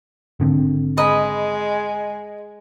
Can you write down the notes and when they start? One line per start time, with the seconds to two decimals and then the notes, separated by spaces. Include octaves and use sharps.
0.40 G#1 D3 C4
0.97 G#3 D#5 B5